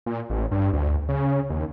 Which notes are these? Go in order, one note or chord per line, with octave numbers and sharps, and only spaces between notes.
A#2
A1
G2
D2
C#3
D#2